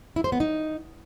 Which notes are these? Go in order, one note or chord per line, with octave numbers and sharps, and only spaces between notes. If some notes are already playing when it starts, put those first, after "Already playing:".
E4
C5
B3
D#4